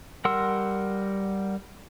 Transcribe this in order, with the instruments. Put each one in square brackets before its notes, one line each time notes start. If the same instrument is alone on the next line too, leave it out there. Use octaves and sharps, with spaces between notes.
[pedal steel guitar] G3 A#4 F#5 C6 E6